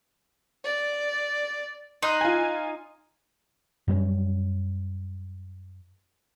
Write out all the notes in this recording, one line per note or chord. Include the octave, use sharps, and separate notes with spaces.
D5
D#4 C6 D#6 F#6
F4 G#5
F#2 G3 B3 C#4